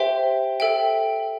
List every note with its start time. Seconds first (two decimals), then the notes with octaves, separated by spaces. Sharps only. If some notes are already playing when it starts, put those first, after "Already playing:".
Already playing: G4 C5 E5 G5 C6
0.60 A4 E5 G5